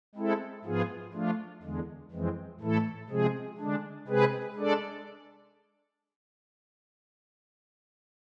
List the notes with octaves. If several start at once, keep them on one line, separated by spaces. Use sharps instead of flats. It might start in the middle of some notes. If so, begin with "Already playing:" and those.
G#3 C4 E4 A4
G#2 F3 B3 F4 G#4
F3 A3 D4 F4
E2 D3 G#3
F2 E3 G#3 C4
A2 E3 A3 E4 A4
C3 F3 G#3 C4 G#4
D3 G#3 D4
C3 G#3 C4 G#4 B4
G#3 D4 A4 D5